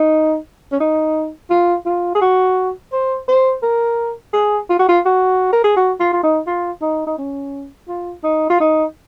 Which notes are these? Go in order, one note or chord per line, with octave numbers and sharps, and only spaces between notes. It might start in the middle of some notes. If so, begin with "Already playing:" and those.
Already playing: D#4
C#4
D#4
F4
F4
G#4
F#4
C5
C5
A#4
G#4
F4
F#4
F4
F#4
A#4
G#4
F#4
F4
F4
D#4
F4
D#4
D#4
C#4
F4
D#4
F4
D#4